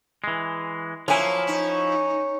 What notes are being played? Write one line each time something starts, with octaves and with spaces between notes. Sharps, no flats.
E3 G#3
F3 F#3 A#3 E4 C#5 G#5
C#4 D#4